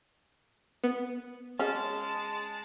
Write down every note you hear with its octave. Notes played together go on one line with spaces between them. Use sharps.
B3
G#3 C#4 G#4 A5